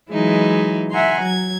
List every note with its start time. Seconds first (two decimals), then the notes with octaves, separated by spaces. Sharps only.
0.10 E3 F#3 G#3 D#4 E4
0.91 E5 F#5 G#5 A#5 C6
1.21 F#3 G#6